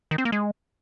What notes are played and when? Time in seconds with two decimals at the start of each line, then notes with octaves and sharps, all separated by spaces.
0.11 D#3
0.18 C4
0.25 A#3
0.32 G#3